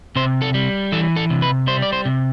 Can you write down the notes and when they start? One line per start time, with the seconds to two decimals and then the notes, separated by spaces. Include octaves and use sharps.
0.16 C3 C5
0.42 A4
0.54 G3
0.92 E3 A4
1.16 A4
1.30 C3
1.42 B4
1.67 G3 C5
1.82 D5
1.93 C5
2.05 C3